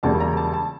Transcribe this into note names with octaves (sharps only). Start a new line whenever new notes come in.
E1 E2 C#3 G3 A#3 A5
A#5
A5
A5